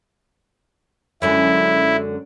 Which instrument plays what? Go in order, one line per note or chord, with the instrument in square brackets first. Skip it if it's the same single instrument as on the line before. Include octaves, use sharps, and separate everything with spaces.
[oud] F#2 D3 G#3 [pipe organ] E4